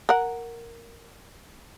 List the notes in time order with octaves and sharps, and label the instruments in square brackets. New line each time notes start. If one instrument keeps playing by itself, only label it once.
[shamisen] A#4 F#5